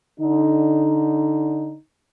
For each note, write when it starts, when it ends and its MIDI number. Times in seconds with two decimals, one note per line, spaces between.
0.19 1.74 50
0.19 1.74 63